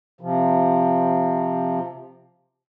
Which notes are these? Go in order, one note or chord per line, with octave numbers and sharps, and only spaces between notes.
C3 F3